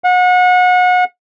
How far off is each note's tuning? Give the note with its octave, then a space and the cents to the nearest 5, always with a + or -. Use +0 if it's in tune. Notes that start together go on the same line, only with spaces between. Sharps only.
F#5 -30